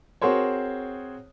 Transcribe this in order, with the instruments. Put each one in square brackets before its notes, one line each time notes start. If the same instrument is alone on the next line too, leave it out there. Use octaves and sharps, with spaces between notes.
[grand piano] C4 F#4 G#4 A#4 C5 C#5